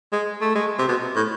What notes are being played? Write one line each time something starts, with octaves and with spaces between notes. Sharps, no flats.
G#3
A3
G#3
C3
B2
A2